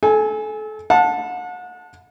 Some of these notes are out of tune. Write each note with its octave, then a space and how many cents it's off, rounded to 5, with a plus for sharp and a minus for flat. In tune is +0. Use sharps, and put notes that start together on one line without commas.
A4 -30 G#5 +0
F#5 -35 A5 +0